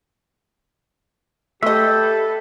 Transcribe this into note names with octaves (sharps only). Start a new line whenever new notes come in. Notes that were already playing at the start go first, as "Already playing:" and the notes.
A3 G4 A4 B4 D#5 E5